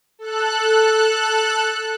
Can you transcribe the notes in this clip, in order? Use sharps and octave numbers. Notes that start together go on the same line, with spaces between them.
A4 F#6